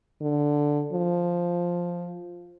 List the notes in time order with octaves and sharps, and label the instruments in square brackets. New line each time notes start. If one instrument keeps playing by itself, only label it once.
[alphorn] D3
F3